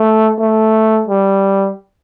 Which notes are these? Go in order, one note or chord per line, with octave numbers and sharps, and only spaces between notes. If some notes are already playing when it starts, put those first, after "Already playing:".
Already playing: A3
A3
G3